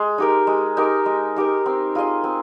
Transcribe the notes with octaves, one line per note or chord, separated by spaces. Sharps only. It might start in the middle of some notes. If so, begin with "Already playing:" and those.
Already playing: G#3
D#4 G4 A#4
G#3
D#4 G4 A#4
G#3
D#4 G4 A#4
C4
F4 G#4 D#5
C4